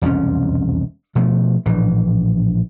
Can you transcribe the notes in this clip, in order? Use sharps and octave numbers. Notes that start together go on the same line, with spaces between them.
E1 C2 F2 C#4
B2 F3 A3
A#1 A2 E3